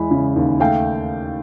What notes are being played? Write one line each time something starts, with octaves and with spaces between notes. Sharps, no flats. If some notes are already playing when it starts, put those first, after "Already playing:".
Already playing: E2 E3 G#3 B5
C#3
D#2
A3 F5 G5